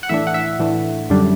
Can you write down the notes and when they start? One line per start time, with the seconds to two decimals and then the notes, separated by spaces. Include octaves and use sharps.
0.03 F#5
0.09 A2 E3 A3 D4 E5
0.27 F#5
0.34 E5
0.59 A2 E3 A3 D4
1.10 F#2 D3 G3 D4